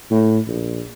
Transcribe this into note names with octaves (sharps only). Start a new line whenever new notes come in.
A2
A#1